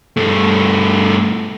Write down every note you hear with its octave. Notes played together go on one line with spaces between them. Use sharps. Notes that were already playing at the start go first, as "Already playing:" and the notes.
G2 A3